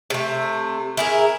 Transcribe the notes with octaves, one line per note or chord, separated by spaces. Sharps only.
C3 A3
E4 G#4 A#4